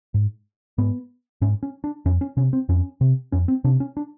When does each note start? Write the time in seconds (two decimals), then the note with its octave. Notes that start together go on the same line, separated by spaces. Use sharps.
0.14 G#2
0.78 G#2 B3
1.41 G#2 C#4
1.63 C#4
1.84 D4
2.05 F2 C#4
2.21 C#4
2.37 C3 C#4
2.53 C4
2.69 F2 C#4
3.01 C3
3.32 F2 C#4
3.48 C4
3.64 C3 D4
3.80 C#4
3.97 D4